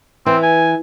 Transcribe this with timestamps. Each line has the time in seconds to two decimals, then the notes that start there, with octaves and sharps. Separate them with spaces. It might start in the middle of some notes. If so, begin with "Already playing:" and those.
0.26 E3 C4
0.43 G#5